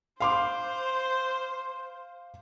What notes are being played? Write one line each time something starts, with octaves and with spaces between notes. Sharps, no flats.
C5 F5 C6 D6